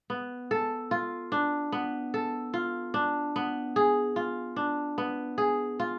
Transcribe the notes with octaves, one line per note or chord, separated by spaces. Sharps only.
B3
A4
F4
D4
B3
A4
F4
D4
B3
G#4
F4
D4
B3
G#4
F4